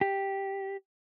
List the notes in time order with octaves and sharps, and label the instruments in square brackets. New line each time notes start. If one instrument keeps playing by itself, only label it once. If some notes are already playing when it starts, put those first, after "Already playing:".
[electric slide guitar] G4